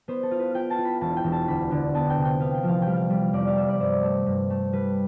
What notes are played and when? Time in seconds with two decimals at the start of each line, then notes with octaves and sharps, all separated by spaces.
0.08 B3 C5
0.23 A4
0.31 F4
0.39 B4
0.54 F4 G5
0.70 A5
0.78 F4
0.85 B5
1.01 E1 A5
1.17 G5
1.24 E1
1.32 A5
1.47 D2 B5
1.71 D3
1.94 B3 A5
2.10 G5
2.17 C3
2.25 G5
2.40 B3 F5
2.55 G5
2.63 F3 F5
2.82 G3 G5
2.96 F5
3.10 G3
3.33 F2 D5
3.47 F5
3.57 G3 E5
3.69 D5
3.80 G2 C5
4.03 A3
4.26 G2
4.50 A3
4.73 G3 B4